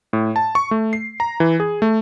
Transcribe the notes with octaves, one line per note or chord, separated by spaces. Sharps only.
A2
A5
C#6
A3
C7
A#5
E3
G#4
A3